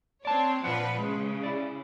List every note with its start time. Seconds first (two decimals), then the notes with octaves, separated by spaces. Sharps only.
0.25 C4 C#5 D5 A5
0.64 A#2 F3 D4 B4 F#5
0.99 C#3 G#3
1.44 E4 D5